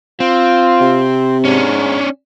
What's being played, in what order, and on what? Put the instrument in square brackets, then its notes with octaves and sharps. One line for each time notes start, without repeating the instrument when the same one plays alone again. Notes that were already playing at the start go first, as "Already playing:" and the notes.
[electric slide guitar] C4 [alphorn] F4
[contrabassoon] C3
[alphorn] G#2 [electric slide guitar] C#4 D4